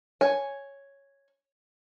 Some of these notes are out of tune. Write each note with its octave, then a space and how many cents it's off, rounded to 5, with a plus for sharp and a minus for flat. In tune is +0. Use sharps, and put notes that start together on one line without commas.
C#5 +0 G#5 +0